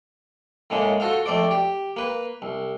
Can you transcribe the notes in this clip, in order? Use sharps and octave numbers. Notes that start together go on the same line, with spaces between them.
A2 C#3 G#3 A#3
F4 F#4 A4 C5 F5
F2 A3 C5 D5 D6
G4
A#3 B4
C2